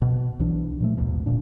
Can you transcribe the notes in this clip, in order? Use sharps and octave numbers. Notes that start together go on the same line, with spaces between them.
B2
B1 E3 D4
A#2 F3 A3
A#1 D#2 G#2 B2
D1 D2 A#2 D4